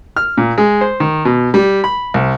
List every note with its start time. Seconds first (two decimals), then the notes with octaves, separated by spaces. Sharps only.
0.16 F6
0.37 A#2
0.58 G#3
0.81 C5
1.00 D#3
1.25 B2
1.54 G3
1.84 B5
2.14 C2